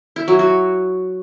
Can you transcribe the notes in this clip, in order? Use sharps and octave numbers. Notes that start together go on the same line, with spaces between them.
E4
F#3
F#4